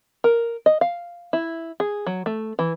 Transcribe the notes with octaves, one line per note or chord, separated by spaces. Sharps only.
A#4
D#5
F5
E4
G#4
F#3
A3
E3